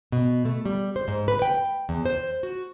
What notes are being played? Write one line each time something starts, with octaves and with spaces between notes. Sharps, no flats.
B2
A3
G3
C5
G#2
B4
G5
E2
C5
F#4